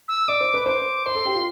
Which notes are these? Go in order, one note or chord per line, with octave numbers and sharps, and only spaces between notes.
E6
D5 D6
C5
B4
C5 D6
C5 C6
A4
G4
F4